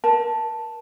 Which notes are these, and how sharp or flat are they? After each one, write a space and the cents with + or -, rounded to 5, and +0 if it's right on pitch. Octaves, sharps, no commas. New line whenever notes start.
A#4 +40 A5 +0